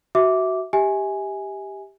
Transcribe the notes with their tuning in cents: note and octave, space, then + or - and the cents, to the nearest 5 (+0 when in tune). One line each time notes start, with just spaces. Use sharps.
F#4 +15 E5 -15 D6 -10
G4 +0 E5 -35 G#5 +0